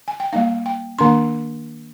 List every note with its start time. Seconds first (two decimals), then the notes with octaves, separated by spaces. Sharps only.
0.08 G#5
0.20 G5
0.33 G3 A#3 D#4 F5
0.66 G5
0.99 D#3 A#3 D4 C6